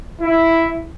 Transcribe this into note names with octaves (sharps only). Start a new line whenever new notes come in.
E4